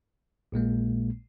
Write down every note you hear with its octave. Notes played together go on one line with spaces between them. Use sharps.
A#1 A#2 G#3 A#3